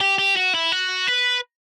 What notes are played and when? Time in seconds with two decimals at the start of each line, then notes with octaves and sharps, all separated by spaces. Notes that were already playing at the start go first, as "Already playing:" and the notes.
0.01 G4
0.19 G4
0.37 F#4
0.55 E4
0.72 F#4
1.07 B4